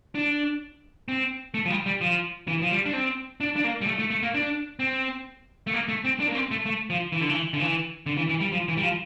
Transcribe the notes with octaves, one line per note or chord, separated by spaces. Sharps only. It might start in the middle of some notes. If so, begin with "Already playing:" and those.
D4
C4
A3
F3
G3
G3
F3
E3
F3
G3
D4
C4
D4
D4
A#3
G3
A3
A3
A3
A#3
D4
C4
A3
A#3
A3
C4
D4
A#3
C4
A3
A3
F3
E3
D3
E3
D3
E3
D3
E3
E3
G3
F3
E3
G3
F3